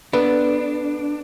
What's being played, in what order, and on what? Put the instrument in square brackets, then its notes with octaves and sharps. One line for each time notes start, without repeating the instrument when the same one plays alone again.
[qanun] B3 [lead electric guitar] D4 [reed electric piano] A4 B4 B5